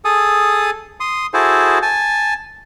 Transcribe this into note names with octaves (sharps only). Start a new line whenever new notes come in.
G#4 A4 D#6
C6 D#6
E4 F#4 G#4 A4 C5
G#5 A5